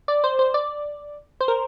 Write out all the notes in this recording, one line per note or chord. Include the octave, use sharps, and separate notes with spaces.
D5
C5
C5
D5
C5
A#4